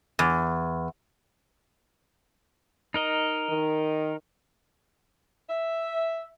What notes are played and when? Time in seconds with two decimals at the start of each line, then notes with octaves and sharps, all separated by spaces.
0.19 E2
2.94 D#4 A#4 D#5
3.49 D#3
5.50 E5